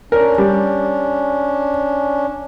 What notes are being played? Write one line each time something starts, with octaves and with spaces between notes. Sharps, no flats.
C#4 D4 A#4
G3